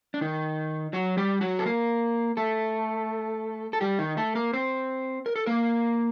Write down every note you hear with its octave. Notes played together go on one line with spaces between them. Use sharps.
D4
D#3 D#4
F#3 F#4
G3 G4
F#3 F#4
A4
A#3 A#4
A3 A4
A4
G3 G4
D#3 D#4
A3 A4
A#3 A#4
C4 C5
A#4
A4
A#3 A#4